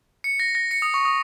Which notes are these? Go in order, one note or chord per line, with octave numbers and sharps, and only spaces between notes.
C#7
A#6
A#6
C#7
D#6
C#6
D#6